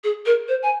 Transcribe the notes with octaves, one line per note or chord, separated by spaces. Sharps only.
G#4
A#4
C5
G#5